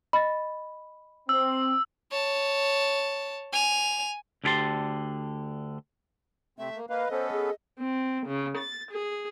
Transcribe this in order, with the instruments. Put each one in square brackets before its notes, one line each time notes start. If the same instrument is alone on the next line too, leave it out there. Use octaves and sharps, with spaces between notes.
[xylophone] D#5 A6 [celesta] B5
[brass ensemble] C4 [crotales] E6
[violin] C#5 A5
G#5 F7
[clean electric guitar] D2 D3 E4 G4 A5 C6
[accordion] C3 C4 [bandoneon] A3 [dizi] E5
[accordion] A#3
[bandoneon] A#3 [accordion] B4 F5 [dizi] D#5
[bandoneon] B3 C#4 B4 [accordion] A4 [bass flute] C5
[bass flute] G#4
[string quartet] C4
C#3
A6
G#4